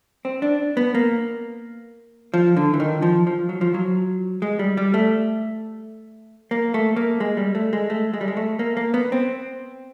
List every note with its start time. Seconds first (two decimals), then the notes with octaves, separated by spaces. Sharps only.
0.25 C4
0.42 D4
0.77 B3
0.95 A#3
2.34 F3
2.57 D3
2.74 E3
2.80 D#3
3.02 F3
3.27 F3
3.49 F#3
3.61 F3
3.74 F#3
4.42 G#3
4.59 G3
4.77 G3
4.94 A3
6.51 A#3
6.74 A3
6.96 A#3
7.20 G#3
7.37 G3
7.55 A3
7.73 G#3
7.90 A3
8.14 G#3
8.21 G3
8.28 G#3
8.37 A3
8.59 A#3
8.77 A#3
8.94 B3
9.12 C4